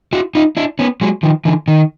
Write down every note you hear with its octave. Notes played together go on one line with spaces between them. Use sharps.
E4 F#4
D#4 F4
D4 E4
B3 C#4
F#3 G#3
D#3 F3
D3 E3
D#3